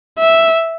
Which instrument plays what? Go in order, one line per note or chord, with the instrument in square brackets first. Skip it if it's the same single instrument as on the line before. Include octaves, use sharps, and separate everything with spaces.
[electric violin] E5